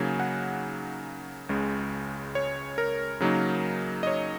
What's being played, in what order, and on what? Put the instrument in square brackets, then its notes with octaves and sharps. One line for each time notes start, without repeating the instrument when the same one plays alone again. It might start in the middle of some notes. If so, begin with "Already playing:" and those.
Already playing: [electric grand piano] C#3 F#3 A#3 D#4 G#5
F#5
C#2 C#3 G#3
C#5
A#4
C#3 F#3 A#3 D#4
D#5
C#5